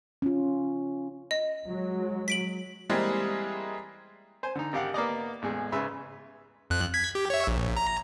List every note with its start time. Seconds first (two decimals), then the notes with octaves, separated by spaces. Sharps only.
0.22 C#4 F4
1.31 D#5
1.65 F#3 G#3
2.28 B6 D7 F#7
2.90 E3 G3 G#3 A#3 C4 G#4
4.43 C5 G#5
4.55 D3 D#4
4.73 G#1 G4 F5 F#5
4.94 A#3 B3 D5 D#5
5.42 A1 E2 G#3
5.72 G#2 C#3 B4 E5 C6
6.70 F2 F#6
6.94 G#6 B6
7.15 G4
7.30 C#5 E5
7.47 A#1
7.77 A#5